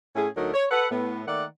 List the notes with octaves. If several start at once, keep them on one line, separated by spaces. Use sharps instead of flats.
A2 C#4 E4 G#4
D2 F#3 A3 D#4 A4 A#4
C#5
A4 B4 F#5
A2 B3
D#3 A3 A#3 D5 F#5